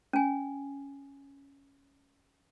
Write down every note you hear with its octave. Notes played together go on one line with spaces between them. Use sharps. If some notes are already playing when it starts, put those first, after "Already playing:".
C#4 G#5